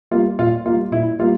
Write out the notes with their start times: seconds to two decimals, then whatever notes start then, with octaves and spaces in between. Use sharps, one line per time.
0.11 G3 A#3 F4
0.39 A#2 F4
0.65 A#3 F4
0.70 G3
0.92 A#2 E4
1.19 G3 A#3 F4